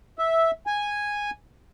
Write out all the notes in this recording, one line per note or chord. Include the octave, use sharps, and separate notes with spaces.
E5
G#5